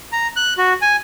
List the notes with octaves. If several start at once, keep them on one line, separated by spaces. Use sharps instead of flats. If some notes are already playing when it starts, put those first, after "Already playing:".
A#5
F#6
F#4
G#5